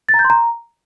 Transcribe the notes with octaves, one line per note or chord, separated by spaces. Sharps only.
A6
A#5
G6
C6
A#5